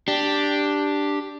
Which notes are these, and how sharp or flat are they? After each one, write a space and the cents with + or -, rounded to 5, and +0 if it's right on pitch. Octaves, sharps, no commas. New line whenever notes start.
D4 +0 G4 +0